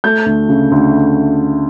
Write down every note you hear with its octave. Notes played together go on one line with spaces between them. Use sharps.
A3 G6
D2
C#3
D2